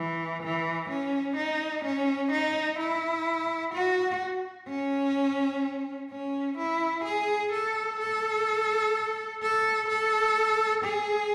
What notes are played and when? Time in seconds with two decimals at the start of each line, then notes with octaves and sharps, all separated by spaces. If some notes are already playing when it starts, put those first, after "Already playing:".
Already playing: E3
0.43 E3
0.90 C#4
1.37 D#4
1.84 C#4
2.32 D#4
2.79 E4
3.74 F#4
4.68 C#4
6.11 C#4
6.58 E4
7.05 G#4
7.53 A4
8.00 A4
9.42 A4
9.89 A4
10.84 G#4